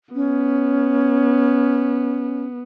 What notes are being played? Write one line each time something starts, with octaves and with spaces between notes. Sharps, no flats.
B3 C#4